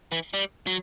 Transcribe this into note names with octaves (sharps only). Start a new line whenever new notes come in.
E3
G3
F#3